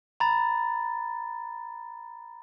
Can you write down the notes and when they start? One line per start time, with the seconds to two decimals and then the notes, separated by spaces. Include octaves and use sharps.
0.20 A#5 B5 A6